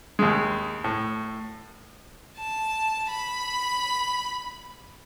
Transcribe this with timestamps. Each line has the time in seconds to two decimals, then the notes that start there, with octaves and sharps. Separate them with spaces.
0.19 D#2 G#3
0.84 A2
2.38 A5
3.10 B5